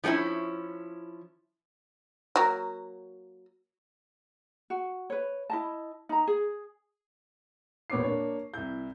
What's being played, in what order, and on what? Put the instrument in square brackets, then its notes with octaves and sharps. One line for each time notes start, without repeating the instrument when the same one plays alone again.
[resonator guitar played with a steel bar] F3 G#3 B3 C#4 E4
[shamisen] F#3 A#3
[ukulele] F#4
B4 C#5
E4 D#5 A5
D#4 A#5
G#4
[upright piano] E1 A#2 B3 C#5 D6 C7
A#3 D4 C#5
C2 E4 G6